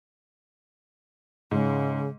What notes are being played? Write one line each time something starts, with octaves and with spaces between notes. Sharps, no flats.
G#2 C#3